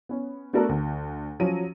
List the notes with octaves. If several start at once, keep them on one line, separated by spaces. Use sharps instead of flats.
B3 C#4
A3 B3 D4 F#4 A4 A#4
D2
F3 F#3 C#4 D#7